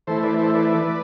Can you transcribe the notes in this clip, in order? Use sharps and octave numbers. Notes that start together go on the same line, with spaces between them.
E3 A3 E4 A4 C5
B4 D5
A4 C5
B4 D5